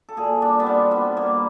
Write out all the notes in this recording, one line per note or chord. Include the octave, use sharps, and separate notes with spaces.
A4
A#2 G#4
G3 D4
B3
G3 C4
G3 B3
G3 A#3